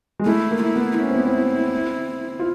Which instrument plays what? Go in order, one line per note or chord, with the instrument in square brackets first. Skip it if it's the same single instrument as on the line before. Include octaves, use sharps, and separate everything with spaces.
[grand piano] G#3
[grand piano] A3 [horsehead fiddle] E4
[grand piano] A#3
[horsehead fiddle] E4
[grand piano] B3
[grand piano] C#4 [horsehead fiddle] E4
[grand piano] C4
B3
C4
F4